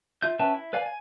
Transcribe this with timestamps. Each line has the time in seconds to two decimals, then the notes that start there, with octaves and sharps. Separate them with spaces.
0.22 F4 E5 G6
0.39 C#4 B4 E5 G5 A5
0.54 E4
0.73 B4 D5 F5 G#5
0.86 G#5